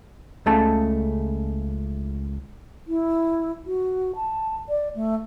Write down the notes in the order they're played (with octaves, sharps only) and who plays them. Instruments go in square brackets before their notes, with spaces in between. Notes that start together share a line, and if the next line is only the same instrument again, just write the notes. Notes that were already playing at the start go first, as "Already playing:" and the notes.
[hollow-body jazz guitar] C#2 C#3 A3 A5
[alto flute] E4
F#4
A5
D5
A3